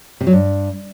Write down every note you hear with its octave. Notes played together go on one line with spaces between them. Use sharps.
C3
F#3
G2